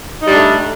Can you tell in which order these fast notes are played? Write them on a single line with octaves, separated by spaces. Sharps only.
D#4 G3 D4 A3